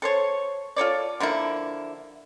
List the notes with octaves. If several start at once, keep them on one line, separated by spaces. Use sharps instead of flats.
A4 C5 C#5
F4 A4 C#5 D5
D3 F3 A#3 E4